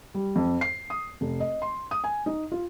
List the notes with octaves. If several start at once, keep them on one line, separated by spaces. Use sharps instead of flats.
G3
F2
C7
D#6
F1
D#5
C6
D#6
G#5
D#4
F4